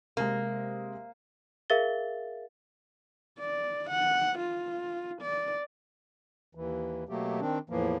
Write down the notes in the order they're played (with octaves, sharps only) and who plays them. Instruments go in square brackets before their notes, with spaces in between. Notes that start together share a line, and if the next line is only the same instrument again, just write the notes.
[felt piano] C3 G#3 [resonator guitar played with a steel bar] A#3
[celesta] G#4 A#4 E5 F5 A6 G7
[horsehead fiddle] D5
F#5
F4
D5
[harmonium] D#2 E3
B2 F#3 A3 A#3 G4
D#3 C4 D4
E2 A2 E3 F3 A#3